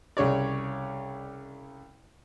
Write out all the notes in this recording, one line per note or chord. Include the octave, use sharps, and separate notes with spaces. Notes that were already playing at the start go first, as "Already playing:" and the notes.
C2 C#3 C#5 D5